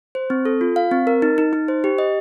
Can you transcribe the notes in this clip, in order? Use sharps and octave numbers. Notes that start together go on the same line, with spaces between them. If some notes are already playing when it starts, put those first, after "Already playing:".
C5
C4
A4
F4
F5
C4
A#4
D#4
D#4
D#4
C5
G4
D#5